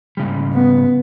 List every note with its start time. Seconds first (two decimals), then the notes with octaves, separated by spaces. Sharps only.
0.17 G#2 C#3 G3
0.55 B3